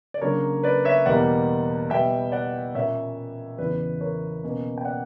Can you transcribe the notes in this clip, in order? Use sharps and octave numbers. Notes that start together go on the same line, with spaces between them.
D5
C#3 F#3 A#3 D4 A#4 C#5
B4 D5
C#5 E5
E2 B2 G3 A#3 D5 F#5
B2 G3 B3 E5 G5
D5 F#5
A#2 A#3 C#4 C#5 E5
E2 C#3 E3 B4 D5
A#4 C#5
B2 A#3 C#4
G5
D5 F#5